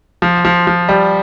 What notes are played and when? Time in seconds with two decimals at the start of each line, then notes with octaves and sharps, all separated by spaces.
0.22 F3
0.45 F3
0.67 F3
0.89 G3